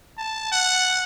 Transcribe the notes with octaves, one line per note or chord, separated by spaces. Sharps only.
A5
F#5